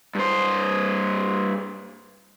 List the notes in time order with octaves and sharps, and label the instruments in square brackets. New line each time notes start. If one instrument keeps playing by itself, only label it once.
[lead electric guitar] G2 C5